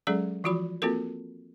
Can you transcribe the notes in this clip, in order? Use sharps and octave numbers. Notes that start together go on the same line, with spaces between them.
F#3 G#3 C#4 G#4 A4 D5
E3 F3 F4 F#4 B5
A#3 C4 F4 F#4 A4 A#4